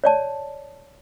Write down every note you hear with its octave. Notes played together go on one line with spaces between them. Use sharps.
C#5 D5 A5